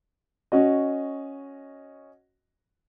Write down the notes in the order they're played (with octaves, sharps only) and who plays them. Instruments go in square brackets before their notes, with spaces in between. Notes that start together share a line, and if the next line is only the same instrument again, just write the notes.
[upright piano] C#4 F#4 D#5